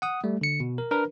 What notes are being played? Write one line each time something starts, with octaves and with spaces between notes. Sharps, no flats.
F#5 D#6
G3 A3
D3 C#7
B2
A#4
D4 A#4 B4